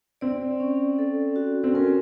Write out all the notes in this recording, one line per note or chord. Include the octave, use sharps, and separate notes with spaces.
C4 D5
C#4
A4
F#4
C4
C#4 A#4